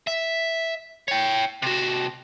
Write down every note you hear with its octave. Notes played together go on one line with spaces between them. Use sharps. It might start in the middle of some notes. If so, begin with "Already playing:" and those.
E5
C#5 G5
C3 F#4